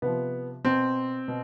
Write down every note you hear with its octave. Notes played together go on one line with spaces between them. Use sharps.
C3 F3 B3
B2 C4
B2